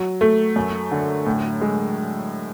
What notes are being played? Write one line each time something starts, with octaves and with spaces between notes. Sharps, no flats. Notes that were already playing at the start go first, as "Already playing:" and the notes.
Already playing: F#3
A3
F#2
D3
A2
G#3